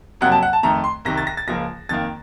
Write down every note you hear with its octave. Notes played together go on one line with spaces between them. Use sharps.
F2 C3 F#3 A#3 F#5
A5
F#5
A5
F2 D#3 A3 A#5
C6
C2 C3 D#3 A#6
A6
A#6
A6
C#2 C#3 F3 A#3 A#6
F2 D#3 A#3 A6